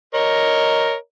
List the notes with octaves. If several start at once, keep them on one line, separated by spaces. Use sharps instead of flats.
A#4 C#5 D#5